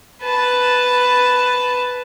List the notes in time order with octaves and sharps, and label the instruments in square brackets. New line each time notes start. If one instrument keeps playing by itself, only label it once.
[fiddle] B4 A5